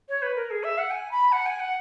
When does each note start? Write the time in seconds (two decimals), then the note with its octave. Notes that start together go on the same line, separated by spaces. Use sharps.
0.08 C#5
0.22 B4
0.35 A#4
0.50 G#4
0.63 E5
0.78 F#5
0.90 G#5
1.11 B5
1.32 F#5
1.46 G#5
1.59 F#5